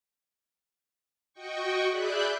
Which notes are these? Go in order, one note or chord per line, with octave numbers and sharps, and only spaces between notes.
F#4 D#5 G5 C#6
G#4 D5 E5 B5 F#6 G6